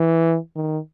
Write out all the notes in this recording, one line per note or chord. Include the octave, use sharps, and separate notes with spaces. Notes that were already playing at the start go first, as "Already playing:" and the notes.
Already playing: E3
D#3